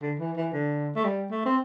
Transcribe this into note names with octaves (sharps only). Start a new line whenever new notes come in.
D3
E3
E3
D3
A3
G3
A3
C4